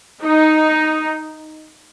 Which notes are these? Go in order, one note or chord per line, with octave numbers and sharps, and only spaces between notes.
D#4